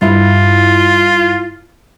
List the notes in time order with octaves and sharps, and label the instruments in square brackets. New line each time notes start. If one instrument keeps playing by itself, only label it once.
[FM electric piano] G2 E4 [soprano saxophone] F4